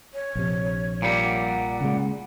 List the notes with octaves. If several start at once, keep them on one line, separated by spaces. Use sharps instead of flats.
C#5
A#1 C3
A#2 G3
F#5
C#3 G#3